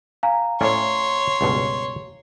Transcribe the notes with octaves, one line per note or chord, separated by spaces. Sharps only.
F5 G#5 A#5
A2 C#4 C#5 D5 C6
C#2 G2 B2